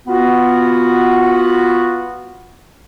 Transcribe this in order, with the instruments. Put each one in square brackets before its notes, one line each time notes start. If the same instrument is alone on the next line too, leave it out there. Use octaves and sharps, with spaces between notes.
[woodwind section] B3 F4 F#4